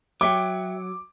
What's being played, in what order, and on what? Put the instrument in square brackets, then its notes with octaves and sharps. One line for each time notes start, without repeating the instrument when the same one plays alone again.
[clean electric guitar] F#3 [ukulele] C#5 E5 G5 [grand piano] D6